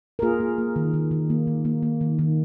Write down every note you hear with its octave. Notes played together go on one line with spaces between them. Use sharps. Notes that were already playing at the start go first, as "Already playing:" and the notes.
A#4
A#3 F4 G#4
A#3
A#3
D#3
D#3
D#3
A#3
D#3
A#3
A#3
D#3
D#3